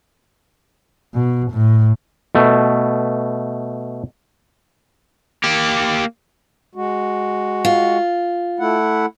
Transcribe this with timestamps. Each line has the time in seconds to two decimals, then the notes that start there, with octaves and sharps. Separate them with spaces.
1.14 B2
1.51 A2
2.35 B2 A3
5.44 A#3 G4
6.75 G#3 F#4
7.65 F4
8.60 A3 E4 F#5